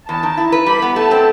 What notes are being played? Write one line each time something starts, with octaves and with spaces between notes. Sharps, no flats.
E2 A5
D#3
E4
B4
G3 B5
B3
A3 A5
C4